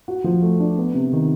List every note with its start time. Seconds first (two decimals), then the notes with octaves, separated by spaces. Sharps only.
0.08 F#4
0.24 F3
0.42 A3
0.60 D4
0.78 B3
0.94 C3
1.13 D#3